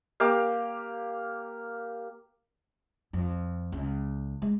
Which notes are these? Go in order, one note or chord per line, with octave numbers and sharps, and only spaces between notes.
A#3 G4 F5
F2
C#2
G#3